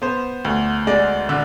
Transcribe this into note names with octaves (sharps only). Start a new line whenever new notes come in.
B3 C5
D2
G#3 D5
D3